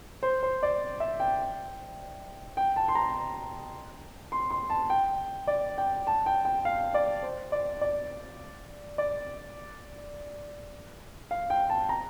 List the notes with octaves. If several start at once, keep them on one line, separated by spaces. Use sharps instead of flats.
C5
C5
D5
E5
G5
G5
A5
C6
A#5
C6
C6
A5
G5
D5
G5
A5
G5
G5
F5
D5
C5
D5
D5
D5
F5
G5
A5
A#5